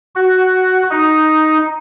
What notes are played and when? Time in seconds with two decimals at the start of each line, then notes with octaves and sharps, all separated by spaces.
0.16 F#4
0.90 D#4